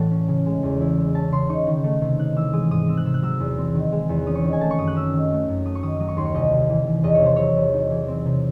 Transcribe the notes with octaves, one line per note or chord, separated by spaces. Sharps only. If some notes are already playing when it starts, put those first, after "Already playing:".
Already playing: A2 E3 F#5 A5
C#4
C#3
G#3
E2
E4
G#3
C#4 A5
C#3 C6
D#4 C#6
D#3
A3
C3
D#4 F#6
E3 E6
G#3 D#6
G#2 D#6
C4 E6
F#6
C3 E6
F#6
F#3 E6
E2
C4
D#3
G#3
E2
C#4 D#6
C#6
D#3
G#5
A3 A5
C#6
F#2 D#6
F#6
C#4 E6
D#3
A3
F#2
A3 D#6
C#6
D#3 D#6
F#3 D#6
C#6
D#2 C6
C#6
C2 D#5
C3
E3
C2
E2 D#5
C#5
C3 C5
F#3 C#5
E2
D#4
E3
C4
C3